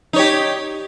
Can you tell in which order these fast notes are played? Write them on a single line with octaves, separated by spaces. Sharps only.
D#4 C#5 G4